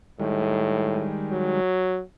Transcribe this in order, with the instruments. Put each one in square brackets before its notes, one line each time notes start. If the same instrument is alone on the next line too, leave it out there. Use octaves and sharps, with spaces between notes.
[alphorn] A2 [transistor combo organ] D#3 G3 G#3
[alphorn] F#3